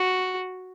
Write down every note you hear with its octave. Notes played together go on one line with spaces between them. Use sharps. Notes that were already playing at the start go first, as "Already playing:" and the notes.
Already playing: F#4